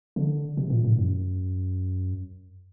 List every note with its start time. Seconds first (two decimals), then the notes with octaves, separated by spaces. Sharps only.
0.16 D3
0.57 C3
0.70 A#2
0.84 A2
0.99 F#2